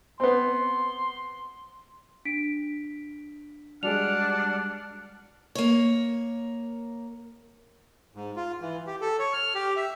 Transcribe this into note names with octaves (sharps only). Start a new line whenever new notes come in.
B3 C4 C6
D4 B6 D7
G3 G#3 D4 F#4 F#5 F6 F7
A#3 C#5
G#2
F4
E3
G4
A4
C#5
F6
G4
E5